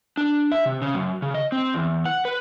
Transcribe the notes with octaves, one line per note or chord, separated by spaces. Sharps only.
D4
E5
C3
C#3
F#2
C#3
D#5
C4
E2
F#5
B4